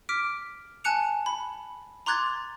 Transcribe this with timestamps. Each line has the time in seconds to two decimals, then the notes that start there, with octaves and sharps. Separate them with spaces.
0.09 D6 F6 B6 D7
0.84 G#5 A5 F#6 C#7 F7
1.26 B5
2.06 A#5 C6 D6 F#6 G#6 A6